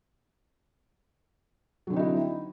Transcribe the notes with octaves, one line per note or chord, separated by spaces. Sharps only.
D3 F#3 C4 D#4 E4